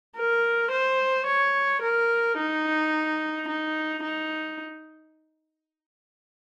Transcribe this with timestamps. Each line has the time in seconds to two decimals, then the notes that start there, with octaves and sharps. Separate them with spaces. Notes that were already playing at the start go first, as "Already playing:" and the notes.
0.17 A#4
0.72 C5
1.27 C#5
1.82 A#4
2.37 D#4
3.48 D#4
4.03 D#4